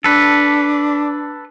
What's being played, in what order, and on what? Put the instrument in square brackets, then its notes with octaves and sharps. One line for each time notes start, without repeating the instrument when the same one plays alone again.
[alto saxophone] D4 [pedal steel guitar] A4 B4